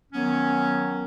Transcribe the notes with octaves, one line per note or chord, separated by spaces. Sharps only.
D#3 F#3 B3 C#4